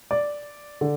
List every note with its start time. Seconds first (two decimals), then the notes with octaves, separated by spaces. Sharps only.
0.11 D5
0.81 D3